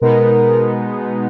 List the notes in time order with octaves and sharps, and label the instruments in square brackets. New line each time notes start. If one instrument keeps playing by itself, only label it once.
[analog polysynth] B2 G#3 B3 D#4 [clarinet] A#4